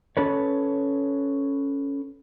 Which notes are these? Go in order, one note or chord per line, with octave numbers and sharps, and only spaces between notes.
C#4 A4 B4 C#5